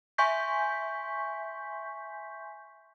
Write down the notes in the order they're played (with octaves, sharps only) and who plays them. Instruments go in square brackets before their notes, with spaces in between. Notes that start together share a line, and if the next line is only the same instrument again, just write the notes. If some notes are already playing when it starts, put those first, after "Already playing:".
[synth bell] E5 G#5 C6 C#6 G6 B6